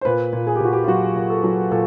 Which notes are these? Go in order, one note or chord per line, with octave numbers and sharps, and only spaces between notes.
C5
A#2 B4
A#2
G#4
G4
A#2 F#4
G4
F4
F#3 F#4
A#2
A4
F#3
A#2 A4